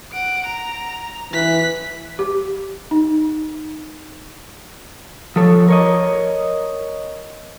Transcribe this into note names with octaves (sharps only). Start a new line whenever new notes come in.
F#5 D7
A#5
E3 F#6 B6
G4
D#4
F3 A4 C#5
A#4 C#5 D#5